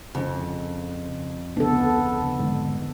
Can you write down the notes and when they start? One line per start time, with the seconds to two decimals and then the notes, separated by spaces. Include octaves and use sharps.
0.15 F2 C#3 C#4
1.57 D2 C#3 B3 D4 A4
2.39 G#2 D3 G#3